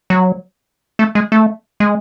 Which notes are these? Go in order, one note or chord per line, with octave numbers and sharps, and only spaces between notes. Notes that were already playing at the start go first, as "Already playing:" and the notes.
F#3
A3
G#3
A3
G#3